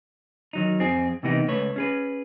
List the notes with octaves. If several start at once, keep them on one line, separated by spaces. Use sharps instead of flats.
D#3 F#3 D#4
F2 C4 G#4
C3 E3 A#3 B3 D#4 G4
C#2 A3 B4 C#5
C#4 G#4 B4